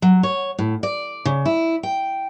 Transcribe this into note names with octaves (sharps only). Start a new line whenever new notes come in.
F#3
C#5
A2
D5
C#3
E4
G5